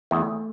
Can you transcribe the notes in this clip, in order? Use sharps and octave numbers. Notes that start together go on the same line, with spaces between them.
E2 A3